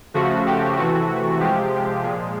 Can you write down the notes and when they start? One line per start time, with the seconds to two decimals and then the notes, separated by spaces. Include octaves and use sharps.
0.14 C#3 F3 A3 F#4
0.46 G4
0.77 C3 E3 A3 F#4
1.40 C3 F3 G#3 G4
2.02 A#2 F3 G#3